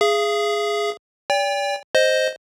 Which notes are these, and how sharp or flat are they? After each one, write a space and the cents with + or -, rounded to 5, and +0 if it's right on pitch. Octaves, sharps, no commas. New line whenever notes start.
G#4 +0 F5 -40
D5 -40 G5 +35
C5 +0 D#5 +0